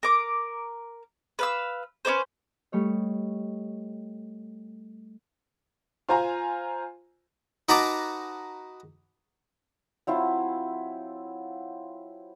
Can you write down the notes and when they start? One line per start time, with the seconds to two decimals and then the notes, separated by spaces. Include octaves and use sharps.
0.03 A#4 D6
1.39 B4 F5 E6
2.05 C#4 D4 B4 C5
2.72 G3 A3 C#5 D#5
6.09 F4 C5 G#5 A#5
7.69 D#4 F#4 B4 A5 A#5 D6
10.07 F#3 C4 E4 F4